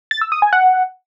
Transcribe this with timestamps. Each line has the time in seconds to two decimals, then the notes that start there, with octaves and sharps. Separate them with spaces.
0.11 A6
0.21 E6
0.32 D#6
0.42 G#5
0.53 F#5